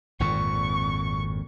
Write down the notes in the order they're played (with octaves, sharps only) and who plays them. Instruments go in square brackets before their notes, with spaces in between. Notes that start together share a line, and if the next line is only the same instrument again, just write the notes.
[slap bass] G#1 F2 A#2 [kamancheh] C#6